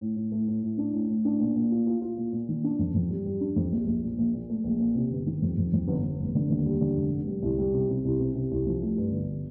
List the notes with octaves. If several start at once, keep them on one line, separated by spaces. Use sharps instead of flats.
A2
A2
A3
A2
A2
D4
A2
A2
D4
A#2
A#2
F4
F4
F4
A#2
A#2
D#3
D4
F2
F2
G3
G3
D4
F2
A#1
A#1
A#2
A#1
A#2
A3
A#1
A#2
C3
G1
D#3
F2
F2
F2
G1
G1
F1
D3
D#2
G3
D3
F1
F1
G3
C2
G3
C3
C3
C2
C3
C3
C2
F3
A3
G2
G1